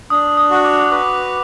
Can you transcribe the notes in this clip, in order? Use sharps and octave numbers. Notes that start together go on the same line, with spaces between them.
D4 D#6
D#6
F#4
D6
B4 D6